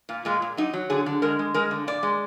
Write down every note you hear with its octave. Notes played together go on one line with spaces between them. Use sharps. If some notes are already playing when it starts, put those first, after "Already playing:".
A#2
A#2 G#3
A#2
F#3 D#4
F#3
D3 G#4
D3
G#3 A#4
G#3
G#3 A#4
D3
A#2 D5
G#3